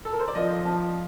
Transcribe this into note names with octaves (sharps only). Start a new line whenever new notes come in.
A4
A#4
C5
D5
F3 D#5
F3 A5